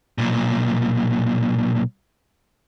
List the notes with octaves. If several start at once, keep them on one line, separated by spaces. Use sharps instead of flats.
B1 A#2